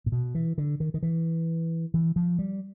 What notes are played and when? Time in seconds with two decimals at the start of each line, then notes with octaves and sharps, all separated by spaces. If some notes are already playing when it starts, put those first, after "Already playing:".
0.06 A#2
0.12 B2
0.35 E3
0.58 D3
0.80 D#3
0.94 D#3
1.03 E3
1.94 E3
2.16 F3
2.39 G3